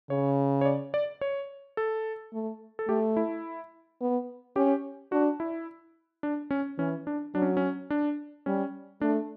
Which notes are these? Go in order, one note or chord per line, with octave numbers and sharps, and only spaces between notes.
C#3 C#5
C#5
D5
D5
C#5
A4
A3
A4
A3 G4
E4
B3
C#4 G4
D4 F#4
E4
D4
C#4
E3 C#4
D4
F#3 D4
C#4
C#4
D4
G3 C#4
A3 D4